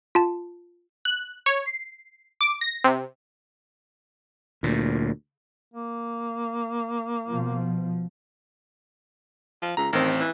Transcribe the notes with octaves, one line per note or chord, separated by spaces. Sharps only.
F4 A5
F#6
C#5
C7
D6
A#6
C3
D2 A#2
A#3
B2 F3
F3
C#2 A#5
A1 D#3 C4
E3